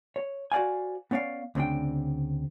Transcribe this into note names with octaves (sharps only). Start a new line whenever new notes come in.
C#5
F#4 C5 D5 F5 G#5
B3 C#4 C#5 D5 F5
D2 C#3 C4 D4 G5